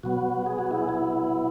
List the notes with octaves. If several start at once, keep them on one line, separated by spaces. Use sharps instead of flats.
B2 F#3 B3 F#4
G#4
F#4
E4 G#4
E4